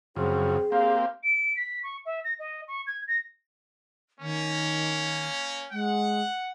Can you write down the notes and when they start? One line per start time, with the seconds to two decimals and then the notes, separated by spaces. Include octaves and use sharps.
0.16 F#2 C#3 F3 C4 G#4
0.72 A#3 C4 G4 F5
1.23 D7
1.56 B6
1.83 C#6
2.06 E5
2.24 A#6
2.39 D#5
2.68 C#6
2.87 G#6
3.08 A#6
4.20 D#3 A#3 C#4
5.72 G#3 F#5